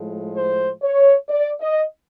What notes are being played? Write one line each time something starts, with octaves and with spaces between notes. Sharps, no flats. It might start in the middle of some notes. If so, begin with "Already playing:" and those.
Already playing: A2 F3 G#3
C5
C#5
D5
D#5